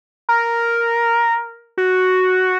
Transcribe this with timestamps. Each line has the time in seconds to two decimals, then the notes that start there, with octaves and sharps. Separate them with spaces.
0.29 A#4
1.78 F#4